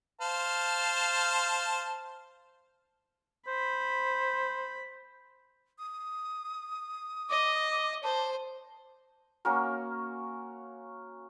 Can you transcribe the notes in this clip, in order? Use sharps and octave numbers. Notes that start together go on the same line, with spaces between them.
C5 F5 A5
C5 B5
D#6
D#5 D6
C5 A5
A#3 C#4 F#4 A#4